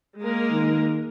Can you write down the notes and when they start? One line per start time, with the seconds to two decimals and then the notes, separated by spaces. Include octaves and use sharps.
0.20 G#3 A#3 A#4
0.51 D#3